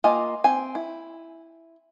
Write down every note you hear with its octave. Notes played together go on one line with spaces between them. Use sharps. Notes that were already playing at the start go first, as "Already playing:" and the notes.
A#3 F4 G4 D#5 G#5
C4 G#5
E4